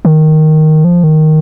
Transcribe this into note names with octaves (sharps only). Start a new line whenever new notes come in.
D#3
F3
D#3